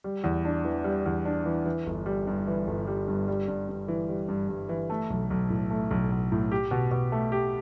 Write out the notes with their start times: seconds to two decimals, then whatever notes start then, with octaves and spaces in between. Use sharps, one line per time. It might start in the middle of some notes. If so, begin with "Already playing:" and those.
0.04 G3
0.24 E2
0.45 D4
0.65 E3
0.84 G3
1.06 E2
1.25 D4
1.46 E3
1.66 E3
1.86 G1
2.06 G3
2.27 G2
2.47 E3
2.67 G1
2.87 G3
3.07 G2
3.28 G3
3.48 G2
3.69 G2
3.88 E3
4.09 G3
4.28 G2
4.49 G2
4.69 E3
4.90 A3
5.10 B1
5.30 B1
5.50 A2
5.70 A3
5.91 B1
6.12 B1
6.32 A2
6.52 G4
6.71 B2
6.91 B2
7.12 A3
7.32 G4